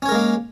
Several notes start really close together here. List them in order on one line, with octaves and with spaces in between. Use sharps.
C#4 C#5 A#4 G#3 A#3